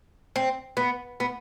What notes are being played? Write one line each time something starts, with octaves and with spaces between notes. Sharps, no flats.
C4
B3
B3